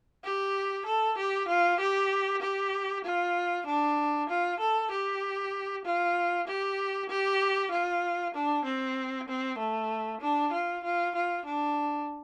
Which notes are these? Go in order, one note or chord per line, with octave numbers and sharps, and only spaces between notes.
G4
A4
G4
F4
G4
G4
F4
D4
F4
A4
G4
F4
G4
G4
F4
D4
C4
C4
A3
D4
F4
F4
F4
D4